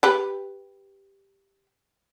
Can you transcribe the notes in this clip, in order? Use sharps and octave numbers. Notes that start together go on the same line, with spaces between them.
G4 B4